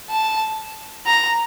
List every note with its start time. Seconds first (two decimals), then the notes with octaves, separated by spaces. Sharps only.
0.10 A5
1.07 A#5